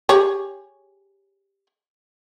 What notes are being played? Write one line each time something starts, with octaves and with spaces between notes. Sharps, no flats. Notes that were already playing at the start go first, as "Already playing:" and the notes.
G4 G#4 C#5